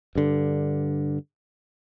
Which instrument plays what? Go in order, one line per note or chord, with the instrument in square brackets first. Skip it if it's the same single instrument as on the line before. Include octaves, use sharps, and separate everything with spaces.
[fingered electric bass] G2 D3